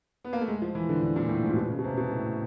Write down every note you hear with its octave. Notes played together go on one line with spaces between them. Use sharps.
B3
A#3
A3
G#3
F3
E3
D3
D3
A#2
A2
G#2
A#2
B2
C#3
B2
C3
B2
A2